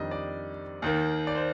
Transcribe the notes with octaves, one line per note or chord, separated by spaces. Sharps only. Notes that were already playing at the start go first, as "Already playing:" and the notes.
Already playing: F2 D#3 G3 D4 D#5
D5
D#2 D#3 A#3
D5
C5